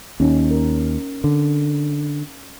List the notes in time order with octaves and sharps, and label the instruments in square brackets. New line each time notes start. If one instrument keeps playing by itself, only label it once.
[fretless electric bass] D#2 [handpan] C#4 D#4
[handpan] A#4
[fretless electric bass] D3